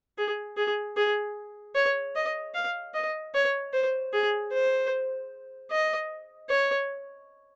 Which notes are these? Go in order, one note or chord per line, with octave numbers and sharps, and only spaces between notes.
G#4
G#4
G#4
C#5
D#5
F5
D#5
C#5
C5
G#4
C5
D#5
C#5